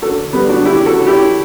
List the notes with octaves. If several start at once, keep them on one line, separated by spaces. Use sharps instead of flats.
D3 F#4 A4
D3 G3 B3
D4 F#4
C#3 E4 G4
F#4 A4
C#3
E4 G4